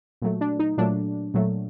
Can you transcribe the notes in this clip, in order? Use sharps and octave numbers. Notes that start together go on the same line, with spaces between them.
A#2 F#3 A3
D4
D#4
A#2 F#3 A3 D4
A#2 F#3 A3